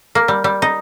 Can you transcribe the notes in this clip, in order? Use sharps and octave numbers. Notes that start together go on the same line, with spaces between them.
A#3
G3
G3
D#4